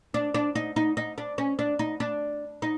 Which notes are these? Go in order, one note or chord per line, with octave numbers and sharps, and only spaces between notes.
D4
D4
D#4
D#4
D#4
D4
C#4
D4
D#4
D4
D#4